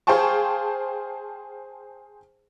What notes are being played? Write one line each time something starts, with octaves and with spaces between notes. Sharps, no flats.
G#4 C5 F5 G5 A5 C#6